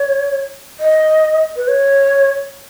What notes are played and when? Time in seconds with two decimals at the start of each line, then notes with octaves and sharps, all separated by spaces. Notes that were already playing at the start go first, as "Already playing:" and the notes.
Already playing: C#5
0.80 D#5
1.56 B4
1.68 C#5